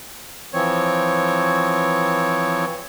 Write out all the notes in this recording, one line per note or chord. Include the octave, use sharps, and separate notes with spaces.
E3 F3 C4 C#5